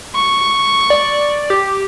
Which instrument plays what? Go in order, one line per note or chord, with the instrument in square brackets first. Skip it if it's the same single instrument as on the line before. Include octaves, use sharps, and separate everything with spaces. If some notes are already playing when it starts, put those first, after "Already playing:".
[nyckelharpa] C#6
[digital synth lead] D5
G4